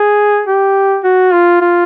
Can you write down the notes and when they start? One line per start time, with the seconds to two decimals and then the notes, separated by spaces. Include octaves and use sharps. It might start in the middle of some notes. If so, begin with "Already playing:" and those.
Already playing: G#4
0.47 G4
1.04 F#4
1.33 F4
1.61 F4